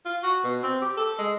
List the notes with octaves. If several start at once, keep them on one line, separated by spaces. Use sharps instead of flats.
F4
F#4
B2
C4
G4
A4
G#3